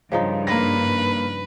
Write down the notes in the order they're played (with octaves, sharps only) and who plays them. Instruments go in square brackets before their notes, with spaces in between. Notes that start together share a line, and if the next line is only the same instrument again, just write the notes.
[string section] G2 [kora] C#3 F3 D#4
[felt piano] A#3 A#6 [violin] B4